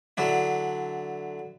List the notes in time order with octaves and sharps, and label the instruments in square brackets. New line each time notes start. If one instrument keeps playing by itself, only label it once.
[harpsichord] D3 F#3 D4 E4